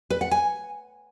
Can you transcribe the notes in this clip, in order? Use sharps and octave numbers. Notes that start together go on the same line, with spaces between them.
B4
F#5
G#5